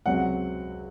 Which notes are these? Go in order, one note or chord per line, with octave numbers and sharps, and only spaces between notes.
C#2 C3 F#3 C4 F#5